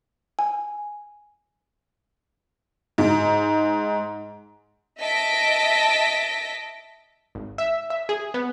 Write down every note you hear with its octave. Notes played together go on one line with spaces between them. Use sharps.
G#5
G#2
D#5 E5 A5 A#6 B6 D7
G#1
E5
E5
G#4
B3